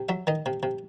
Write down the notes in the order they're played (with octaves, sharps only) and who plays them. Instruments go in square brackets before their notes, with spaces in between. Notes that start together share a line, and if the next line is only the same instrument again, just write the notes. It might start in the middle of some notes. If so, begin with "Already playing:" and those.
Already playing: [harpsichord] C3
F#3 E5
D#3 D#5
C3
C3